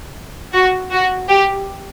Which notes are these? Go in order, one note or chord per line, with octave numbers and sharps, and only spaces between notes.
F#4
F#4
G4